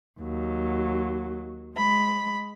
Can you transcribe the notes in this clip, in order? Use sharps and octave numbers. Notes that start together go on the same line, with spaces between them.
D#2 F#3
G#3 B5